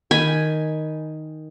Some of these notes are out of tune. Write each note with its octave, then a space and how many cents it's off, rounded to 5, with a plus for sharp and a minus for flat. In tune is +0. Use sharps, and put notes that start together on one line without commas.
D#3 +0 G#5 +0 B5 +0